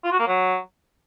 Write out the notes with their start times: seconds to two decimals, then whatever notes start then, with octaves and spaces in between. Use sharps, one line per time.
0.04 F4
0.12 F#4
0.20 A#3
0.27 F#3